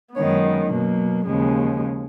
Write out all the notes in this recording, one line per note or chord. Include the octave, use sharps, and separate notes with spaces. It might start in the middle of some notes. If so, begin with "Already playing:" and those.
F#2 D#3 G#3 B3 C#5
B2 F#3 A#3
D#2 C#3 F3 G#3